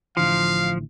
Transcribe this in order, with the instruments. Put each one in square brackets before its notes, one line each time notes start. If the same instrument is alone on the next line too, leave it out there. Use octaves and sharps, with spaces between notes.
[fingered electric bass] A1 D3 E3 [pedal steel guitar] F3 [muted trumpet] F5